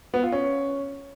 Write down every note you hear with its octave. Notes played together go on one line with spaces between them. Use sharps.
B3
F4
C#4